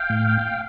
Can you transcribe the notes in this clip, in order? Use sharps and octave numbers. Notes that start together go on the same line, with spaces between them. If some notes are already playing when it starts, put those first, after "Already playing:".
Already playing: F5 G5
A2